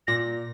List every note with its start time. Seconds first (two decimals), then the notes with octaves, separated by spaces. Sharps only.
0.07 A#2 A#6